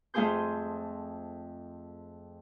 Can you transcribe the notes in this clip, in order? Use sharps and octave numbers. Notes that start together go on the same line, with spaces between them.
F2 A3 F4 G#4 C5 G6